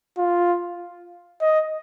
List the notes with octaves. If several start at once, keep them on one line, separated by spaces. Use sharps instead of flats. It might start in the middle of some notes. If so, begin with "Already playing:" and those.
F4
D#5